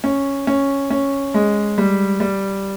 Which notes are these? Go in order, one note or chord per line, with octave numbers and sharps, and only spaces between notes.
C#4
C#4
C#4
G#3
G3
G3